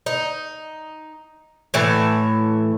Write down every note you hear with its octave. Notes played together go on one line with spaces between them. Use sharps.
D#4
A2 E3 E5